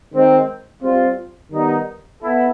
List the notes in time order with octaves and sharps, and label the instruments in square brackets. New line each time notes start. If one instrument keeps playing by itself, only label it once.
[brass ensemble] D#3 G#3 C4 D#4
G3 C4 F4
D#3 G3 B3 D#4
B3 E4 A4